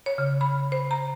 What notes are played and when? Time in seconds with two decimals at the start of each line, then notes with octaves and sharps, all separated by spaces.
0.06 C#5
0.18 C#3
0.41 B5
0.72 C5
0.91 A#5